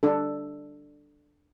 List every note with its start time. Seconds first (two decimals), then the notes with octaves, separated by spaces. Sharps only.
0.03 D4 A4